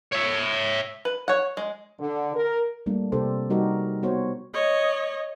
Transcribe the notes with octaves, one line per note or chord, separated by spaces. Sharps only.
C#5 E5
B4
C#5 F#5
G#3
D3
A#4
G3 A3 A#3 D4
C3 A#3 D4 G4 A4 C5
G3 D#4 F#4 G4 A#4
B3 F#4 C5 C#5
C#5 D#5